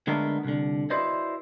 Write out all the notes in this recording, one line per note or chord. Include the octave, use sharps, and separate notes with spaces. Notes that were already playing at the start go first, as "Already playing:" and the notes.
D3 G#3 A3 B3 D4 A#4
C2 D3
E4 F#4 B4 C5 D5 D#5